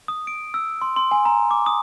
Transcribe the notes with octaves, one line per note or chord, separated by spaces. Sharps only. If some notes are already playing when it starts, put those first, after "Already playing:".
D#6
D7
E6
C6
C6
G#5
A#5
D6
D#6